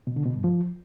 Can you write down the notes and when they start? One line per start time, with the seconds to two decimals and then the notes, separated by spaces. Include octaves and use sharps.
0.07 B2
0.16 D3
0.26 B2
0.35 G2
0.44 F3